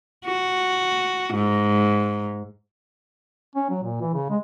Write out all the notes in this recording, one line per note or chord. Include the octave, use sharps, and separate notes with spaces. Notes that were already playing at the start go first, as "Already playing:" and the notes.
F#4
G#2
C#4
F#3
A#2
E3
C#3
G#3